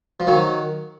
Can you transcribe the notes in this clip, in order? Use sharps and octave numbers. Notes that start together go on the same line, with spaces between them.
F3
D#3 F#3